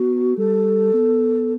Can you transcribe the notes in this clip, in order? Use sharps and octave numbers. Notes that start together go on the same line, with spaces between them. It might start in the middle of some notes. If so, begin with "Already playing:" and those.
Already playing: B3 F#4
G3 A4
B3